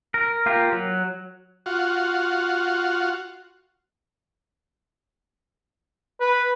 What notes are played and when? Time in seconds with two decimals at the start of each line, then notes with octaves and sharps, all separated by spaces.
0.14 A#4
0.46 A#3 F4 G4 A#4
0.72 F#3
1.66 F4 F#4
6.20 B4